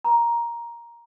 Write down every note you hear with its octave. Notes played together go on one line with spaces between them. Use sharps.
A#5